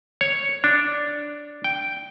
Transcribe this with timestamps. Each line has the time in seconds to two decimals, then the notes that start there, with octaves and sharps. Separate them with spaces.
0.21 C#5
0.64 D4
1.64 G5